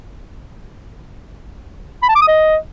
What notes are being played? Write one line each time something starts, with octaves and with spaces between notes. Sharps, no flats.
B5
A5
D6
D#6
D#5